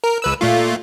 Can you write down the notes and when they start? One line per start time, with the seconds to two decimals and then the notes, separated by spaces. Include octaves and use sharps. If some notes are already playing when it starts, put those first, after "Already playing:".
0.04 A#4
0.22 C#2 B4 E6
0.41 A#2 A3 F4